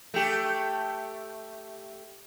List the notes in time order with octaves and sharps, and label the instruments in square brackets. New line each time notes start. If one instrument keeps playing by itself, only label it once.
[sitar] A3 G4